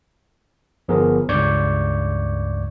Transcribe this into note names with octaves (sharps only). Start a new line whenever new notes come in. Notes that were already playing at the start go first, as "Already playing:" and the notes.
G1 F3 B3 G#4 A#4
C#2 G2 D5 C#6 G6 G#6